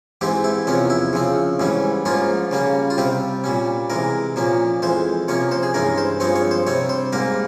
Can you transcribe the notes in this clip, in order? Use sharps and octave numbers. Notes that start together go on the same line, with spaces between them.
G#2 E3 G#3 C4 G4
E4
E2 C3 F3 C4 C#4
E4
C#3 F3 C4
G#2 E3 G3 C#4
G#2 F3 A#3 C#4 F4
C#3 G3 A#3 C#4
F4
C3 G3 C4 G4
A#2 G3 C#4
C3 E3 G#3 A#4
A#2 F3 A#3 C#4
F2 E3 G#3 C5
C3 F3 A#3 C#4 C#5
C5
G#4
G2 E3 G#3 C#4 A#4
C5
G2 F3 G#3 C4 C#5
C#5
C5
C3 G3 C4 C#5
C5
G#2 G3 A#3 A#4